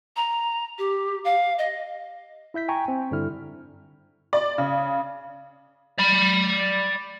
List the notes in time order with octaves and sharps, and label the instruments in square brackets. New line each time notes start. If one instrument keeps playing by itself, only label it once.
[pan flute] A#5
G4
F5
D#5
[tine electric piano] E4 E5 G6 B6
G5 G#5 A#5 C#6
C4
G2 D3 G3 E4 F6
[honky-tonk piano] D5
C#3
[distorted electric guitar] D5 B5